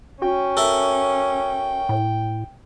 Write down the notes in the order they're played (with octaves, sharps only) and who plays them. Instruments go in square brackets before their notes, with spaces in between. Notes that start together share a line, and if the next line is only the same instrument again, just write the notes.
[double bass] C#4 [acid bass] F#4 [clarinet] G5
[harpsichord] A4 A#4 E5
[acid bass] A2